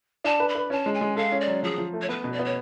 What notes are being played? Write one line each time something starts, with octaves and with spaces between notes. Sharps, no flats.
D4 A5
B4
B5
B4
C#4 A5
G#3
G#5
G#3
A4 F5
C#4
D5
F#3
F3 G#4
F3
A3
C#5
B3 B4
B2
D5
B3 C#5